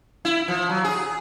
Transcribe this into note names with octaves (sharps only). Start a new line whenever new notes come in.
E4
F3
F#3
G#4